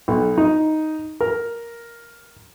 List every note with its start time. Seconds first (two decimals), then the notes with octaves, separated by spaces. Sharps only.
0.08 B1
0.38 D#4
1.21 A#4